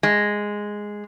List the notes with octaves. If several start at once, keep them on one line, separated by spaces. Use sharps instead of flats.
G#3